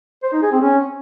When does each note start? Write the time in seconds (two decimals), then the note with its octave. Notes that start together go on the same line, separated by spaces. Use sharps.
0.23 C5
0.33 D#4
0.42 G#4
0.52 C4
0.62 C#4